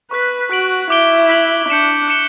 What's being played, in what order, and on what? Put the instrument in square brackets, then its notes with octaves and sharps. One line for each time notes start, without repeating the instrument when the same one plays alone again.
[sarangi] B4 [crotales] C#6 F#6 B6
[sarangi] F#4 [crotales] F#6 B6 D7 F#7
[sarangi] E4 [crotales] D6 G6 D7 G7
[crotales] F#6 B6 D7 F#7
[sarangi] D4 [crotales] G6 C#7 E7 G7
[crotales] F#6 C#7 E7 G7